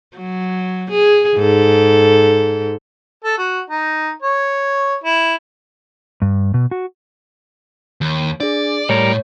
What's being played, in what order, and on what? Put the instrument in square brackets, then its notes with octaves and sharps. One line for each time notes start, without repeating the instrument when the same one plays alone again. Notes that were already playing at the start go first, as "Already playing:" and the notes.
[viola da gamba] F#3
G#4
G#2 A4
[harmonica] A4
F#4
D#4
C#5
E4
[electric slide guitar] G2
B2
F#4
[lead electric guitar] D#2
[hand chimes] D4 G#4 [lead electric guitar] D5
[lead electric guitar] A2 [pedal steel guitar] G3 A#4 [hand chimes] C#5